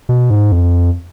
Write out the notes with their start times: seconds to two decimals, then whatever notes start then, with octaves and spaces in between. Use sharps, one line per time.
0.09 B2
0.30 G#2
0.52 F2